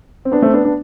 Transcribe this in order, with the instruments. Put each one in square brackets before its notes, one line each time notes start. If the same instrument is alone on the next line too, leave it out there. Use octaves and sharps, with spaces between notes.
[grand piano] C4
B3 D4
A3 C4
B3 D4
B3 D4